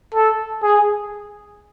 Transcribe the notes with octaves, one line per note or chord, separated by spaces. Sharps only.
A4
G#4